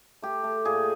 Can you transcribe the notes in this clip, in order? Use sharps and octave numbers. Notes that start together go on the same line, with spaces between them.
A3 G4
A3
A#2 G#4